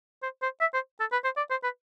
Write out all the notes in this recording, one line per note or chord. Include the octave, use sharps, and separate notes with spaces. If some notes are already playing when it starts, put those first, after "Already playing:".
C5
C5
E5
C5
A4
B4
C5
D5
C5
B4